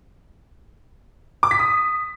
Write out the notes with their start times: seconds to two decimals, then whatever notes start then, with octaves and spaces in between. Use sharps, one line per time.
1.43 D6
1.51 B6
1.59 D#6